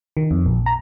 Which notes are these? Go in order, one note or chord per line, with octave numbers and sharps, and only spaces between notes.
D#3
F2
A#1
A#5